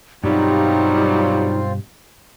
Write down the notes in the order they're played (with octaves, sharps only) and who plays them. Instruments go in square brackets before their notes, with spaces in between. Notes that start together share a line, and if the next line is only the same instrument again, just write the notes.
[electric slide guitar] G2 B2 G4 [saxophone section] F#3 G3 [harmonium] C4 F4 [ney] D#4